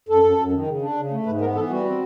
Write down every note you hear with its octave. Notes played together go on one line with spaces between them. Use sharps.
F#2 A4
F#2
F#2
D#3
C#3
D4
C#3
A3
G#2 B4
B3 A#4
E3 A4
G3 F#4
C4